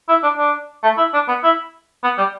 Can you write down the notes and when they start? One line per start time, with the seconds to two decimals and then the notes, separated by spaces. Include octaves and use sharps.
0.09 E4
0.23 D4
0.37 D4
0.83 A3
0.97 E4
1.14 D4
1.28 B3
1.44 E4
2.04 B3
2.18 G3